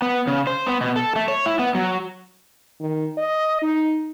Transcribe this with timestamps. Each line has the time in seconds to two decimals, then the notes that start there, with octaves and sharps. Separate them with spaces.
0.02 B3
0.27 C#3
0.47 C5
0.67 B3
0.81 B2
0.96 A4
1.16 A3
1.28 C#5
1.46 E4
1.59 B3
1.75 F#3
2.81 D#3
3.17 D#5
3.62 D#4